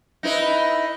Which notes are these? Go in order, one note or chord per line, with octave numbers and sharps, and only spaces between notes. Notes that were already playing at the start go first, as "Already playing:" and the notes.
D#4 E4 B4